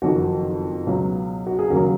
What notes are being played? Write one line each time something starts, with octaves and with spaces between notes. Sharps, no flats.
F#1 F2 D#3 F#4
C#2 B2 F#3
F#4
G#4
D#2 C#3 F#3 F#4 A#4